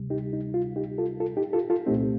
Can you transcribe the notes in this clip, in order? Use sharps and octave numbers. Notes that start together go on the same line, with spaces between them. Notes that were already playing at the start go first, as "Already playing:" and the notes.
Already playing: D2 C3 G3
D#4 G4
D#4
F4
D#4 G4
F4 A4
F4 A4
D#4 G4
F4 A4
F4 A4
C2 A#2 A3 C4 D#4 G4